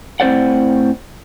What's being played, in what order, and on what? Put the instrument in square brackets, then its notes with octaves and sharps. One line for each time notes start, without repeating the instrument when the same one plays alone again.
[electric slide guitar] A2 C4 C5 D5 F#5